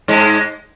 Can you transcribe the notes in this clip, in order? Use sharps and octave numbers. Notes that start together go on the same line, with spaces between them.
G#2 G#3